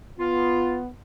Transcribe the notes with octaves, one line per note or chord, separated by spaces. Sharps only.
B3 F4